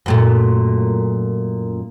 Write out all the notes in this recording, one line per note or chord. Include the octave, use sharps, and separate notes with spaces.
F#2 A#2 A3